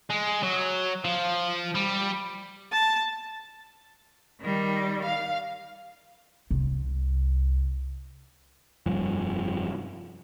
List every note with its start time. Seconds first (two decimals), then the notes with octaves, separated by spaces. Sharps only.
0.10 G#3
0.43 F#3
1.05 F3
1.75 G3
2.72 A5
4.42 D#3 G3
5.05 F5
6.51 C2
8.86 F1 G2 F3